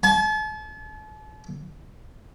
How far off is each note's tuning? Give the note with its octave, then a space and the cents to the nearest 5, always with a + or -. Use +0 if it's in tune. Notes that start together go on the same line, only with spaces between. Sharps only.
A5 -40